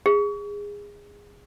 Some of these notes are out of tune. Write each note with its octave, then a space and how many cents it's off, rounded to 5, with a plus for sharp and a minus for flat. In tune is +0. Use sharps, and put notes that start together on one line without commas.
G#4 -20